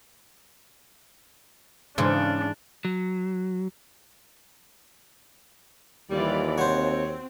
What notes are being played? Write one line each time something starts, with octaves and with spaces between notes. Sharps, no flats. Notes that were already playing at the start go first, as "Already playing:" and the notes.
G#2 C#3 E3 D4
F#3
D#2 E3 G3 F4 D5
C4 F#4 C5 C#5